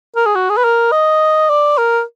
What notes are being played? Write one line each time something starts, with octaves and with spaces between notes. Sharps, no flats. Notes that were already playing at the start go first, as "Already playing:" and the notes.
A#4
G#4
F#4
G#4
B4
A#4
D#5
D5
A#4